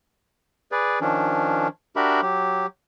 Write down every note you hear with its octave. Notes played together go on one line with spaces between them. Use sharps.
G#4 B4 D5
D#3 F3 C#4 D4
D4 F#4 G4 A#4 E5 B5
F#3 G4